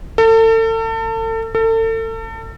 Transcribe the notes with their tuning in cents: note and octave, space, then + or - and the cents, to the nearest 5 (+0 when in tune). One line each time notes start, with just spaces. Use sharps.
A4 +35
A4 +35